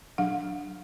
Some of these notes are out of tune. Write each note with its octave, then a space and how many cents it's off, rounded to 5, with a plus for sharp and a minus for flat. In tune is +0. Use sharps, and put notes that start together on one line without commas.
F#3 +0 D4 +10 F#5 -35